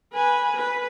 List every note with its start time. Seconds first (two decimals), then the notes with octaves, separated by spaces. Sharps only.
0.13 B4 G#5
0.56 B4